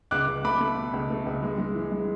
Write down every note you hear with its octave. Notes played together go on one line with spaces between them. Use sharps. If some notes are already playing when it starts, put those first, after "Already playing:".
C#2 D6 F#6
C#2
A3 B5 D6
A3
B2
C#2
A3
C#2
G#3
G#3
E3
G#3